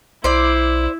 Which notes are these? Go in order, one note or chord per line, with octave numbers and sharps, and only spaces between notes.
B1 E4 C5 D5